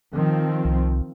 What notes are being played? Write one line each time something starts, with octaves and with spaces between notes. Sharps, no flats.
D#3 F3 C4
C2